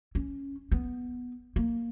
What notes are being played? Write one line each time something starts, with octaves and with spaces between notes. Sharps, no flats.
C#4
B3
A#3